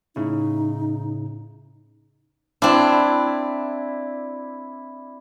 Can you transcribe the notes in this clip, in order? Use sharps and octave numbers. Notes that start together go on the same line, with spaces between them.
A2 C#3 D#4 E4
C4 D4 E4 D5